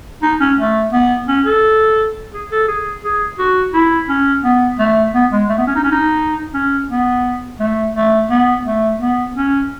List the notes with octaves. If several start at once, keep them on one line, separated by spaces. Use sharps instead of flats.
D#4
C#4
A3
B3
C#4
A4
G#4
A4
G#4
G#4
F#4
E4
C#4
B3
A3
B3
G#3
A3
B3
C#4
D#4
C#4
D#4
C#4
B3
A3
A3
B3
A3
B3
C#4